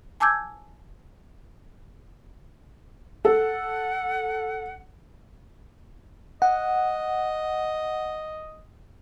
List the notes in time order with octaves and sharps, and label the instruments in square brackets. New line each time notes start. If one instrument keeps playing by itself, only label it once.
[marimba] G#5 A5 D6 E6 G6 G#6
[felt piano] A4 [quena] F#5
[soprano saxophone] D#5 [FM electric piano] F#5